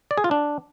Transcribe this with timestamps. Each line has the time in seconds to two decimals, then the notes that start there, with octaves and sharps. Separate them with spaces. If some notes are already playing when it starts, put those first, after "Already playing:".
0.11 D5
0.18 G#4
0.24 F4
0.31 D4